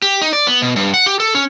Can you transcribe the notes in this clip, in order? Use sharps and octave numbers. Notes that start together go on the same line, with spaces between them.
G4
D#4
D5
B3
B2
G2
F#5
G4
A4
C#4